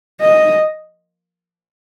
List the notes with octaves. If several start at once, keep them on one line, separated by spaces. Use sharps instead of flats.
D#5